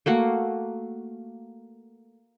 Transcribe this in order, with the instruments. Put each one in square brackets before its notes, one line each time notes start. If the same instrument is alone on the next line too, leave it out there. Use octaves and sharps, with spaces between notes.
[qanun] A3 A#3 F#4